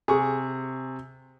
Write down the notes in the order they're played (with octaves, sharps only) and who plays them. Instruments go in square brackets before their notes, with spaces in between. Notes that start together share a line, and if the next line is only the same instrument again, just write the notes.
[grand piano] C3 C#6 [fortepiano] G#4